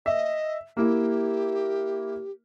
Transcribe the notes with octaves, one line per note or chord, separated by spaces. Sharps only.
D#5 E5
A#3 E4 G4